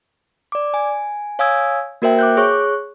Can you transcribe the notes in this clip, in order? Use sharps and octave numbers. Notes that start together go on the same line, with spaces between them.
D5 D6
G#5
C#5 F5 G#5 D#6 E6 G#6
A#3 F#4 A#4 C5 E5 G5
D6 F#6 G6
G#4 C#5 C#6 F#6